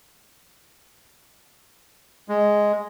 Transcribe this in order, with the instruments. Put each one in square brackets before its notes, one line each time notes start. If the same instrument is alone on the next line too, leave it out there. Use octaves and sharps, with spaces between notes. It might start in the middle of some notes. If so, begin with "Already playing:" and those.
[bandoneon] G#3